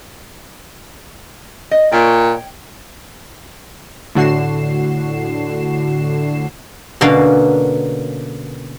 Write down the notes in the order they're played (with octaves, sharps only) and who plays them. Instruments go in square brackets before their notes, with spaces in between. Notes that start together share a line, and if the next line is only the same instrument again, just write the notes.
[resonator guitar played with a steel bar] D#5
[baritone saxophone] A#2 [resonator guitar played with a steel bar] C#5 G5
[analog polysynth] A2 D3 F#4 C7 E7
[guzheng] B2 D3 A#3 C#4 A#4 F5